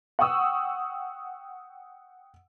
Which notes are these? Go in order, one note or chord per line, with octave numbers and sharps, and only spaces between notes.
F#5 G5 C#6 D#6 E6